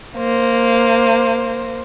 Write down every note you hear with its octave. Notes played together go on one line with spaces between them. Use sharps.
A#3 C5